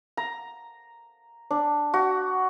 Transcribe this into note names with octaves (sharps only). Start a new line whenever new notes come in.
A#5
D4
F#4